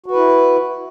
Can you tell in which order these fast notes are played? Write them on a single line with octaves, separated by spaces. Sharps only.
F#4 B4 E4